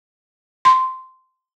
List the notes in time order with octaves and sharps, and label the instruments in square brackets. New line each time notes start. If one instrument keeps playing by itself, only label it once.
[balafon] C6